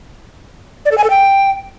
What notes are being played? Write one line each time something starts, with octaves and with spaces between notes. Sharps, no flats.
D5
A4
G#5
A4
G5